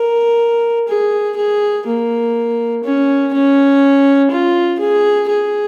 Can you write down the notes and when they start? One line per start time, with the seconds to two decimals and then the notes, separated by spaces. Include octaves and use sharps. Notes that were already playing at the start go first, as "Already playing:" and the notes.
Already playing: A#4
0.88 G#4
1.37 G#4
1.87 A#3
2.84 C#4
3.34 C#4
4.31 F4
4.80 G#4
5.29 G#4